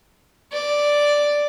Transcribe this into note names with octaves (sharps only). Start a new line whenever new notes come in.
D5